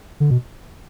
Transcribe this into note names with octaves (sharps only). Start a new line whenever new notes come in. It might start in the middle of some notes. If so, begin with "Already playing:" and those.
D3
B2